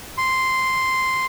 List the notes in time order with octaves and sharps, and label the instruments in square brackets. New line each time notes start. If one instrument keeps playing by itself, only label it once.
[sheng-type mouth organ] C6